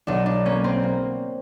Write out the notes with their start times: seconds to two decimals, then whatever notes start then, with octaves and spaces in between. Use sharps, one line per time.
0.07 B1 D4
0.26 D4
0.45 A#3 C#4
0.64 C4
0.83 A#3